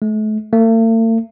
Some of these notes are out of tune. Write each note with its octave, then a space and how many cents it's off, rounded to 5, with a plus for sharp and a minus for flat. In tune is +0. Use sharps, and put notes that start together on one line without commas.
A3 -40
A3 +45